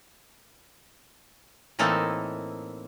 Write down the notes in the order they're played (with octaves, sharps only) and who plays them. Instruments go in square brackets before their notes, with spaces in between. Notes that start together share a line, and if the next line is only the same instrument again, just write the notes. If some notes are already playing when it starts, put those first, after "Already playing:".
[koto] A2 E3 A#3 C4 D#4 A4